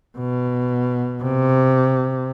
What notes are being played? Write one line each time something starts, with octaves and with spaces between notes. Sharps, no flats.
B2
C3